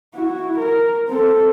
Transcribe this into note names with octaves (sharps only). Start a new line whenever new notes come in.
E4 F#4
A#4
C4 A4